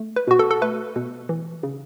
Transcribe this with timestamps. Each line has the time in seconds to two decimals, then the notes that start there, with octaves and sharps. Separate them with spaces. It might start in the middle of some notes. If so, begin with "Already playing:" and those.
Already playing: A3
0.16 B4
0.27 B2 F#4
0.39 A4
0.51 A4
0.62 A3 B4
0.96 B2
1.29 E3
1.63 C#3